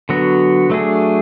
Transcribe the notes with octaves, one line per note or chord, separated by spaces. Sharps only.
D3 F#3 B3 F#4
F#3 A3 D4 G#4